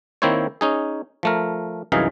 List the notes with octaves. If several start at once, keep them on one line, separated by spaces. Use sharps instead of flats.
D#3 A#3 C4 E4 C5 C#5
C#4 D#4 G#4
F3 A3 A#4
C2 F#2 E3 D#4 G#4 F5